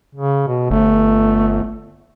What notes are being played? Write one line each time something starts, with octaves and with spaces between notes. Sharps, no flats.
C#3
B2
G1 A3